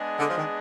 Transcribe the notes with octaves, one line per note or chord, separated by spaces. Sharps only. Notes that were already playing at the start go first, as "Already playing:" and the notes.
Already playing: G#3 B3 D4 G#4 D#5
D3
F3
D#3